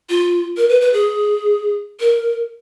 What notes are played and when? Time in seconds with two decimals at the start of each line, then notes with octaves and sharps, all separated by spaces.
0.10 F4
0.57 A#4
0.69 B4
0.81 B4
0.93 G#4
2.00 A#4